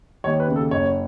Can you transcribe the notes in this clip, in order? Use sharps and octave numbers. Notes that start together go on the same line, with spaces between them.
D#2 C#5
B4
C#3
A4
F#1 C#5